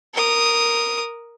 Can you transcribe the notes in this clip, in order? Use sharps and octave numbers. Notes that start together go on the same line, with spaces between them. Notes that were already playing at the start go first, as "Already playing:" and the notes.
A#4 D#6